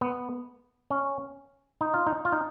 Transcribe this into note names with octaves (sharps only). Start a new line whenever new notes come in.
B3
C#4
D#4
F4
D#4
F4
D#4